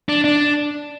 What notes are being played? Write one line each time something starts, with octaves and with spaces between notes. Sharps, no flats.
D4
D4